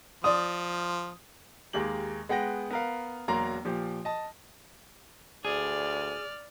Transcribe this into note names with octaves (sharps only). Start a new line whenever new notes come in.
F3 D5 D#6
D#2 G#3 A#3 G4 F#7
G#3 B3 F#5 G5 A#6
B3 A#4 F5
E1 F#3 A#3 A#5 C6
A#2 F3 G4
D#5 A5
D2 G#4 D5 F6